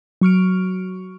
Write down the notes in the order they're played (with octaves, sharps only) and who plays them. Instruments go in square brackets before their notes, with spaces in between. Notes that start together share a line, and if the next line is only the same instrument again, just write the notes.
[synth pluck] F#3 C#6 F6 D7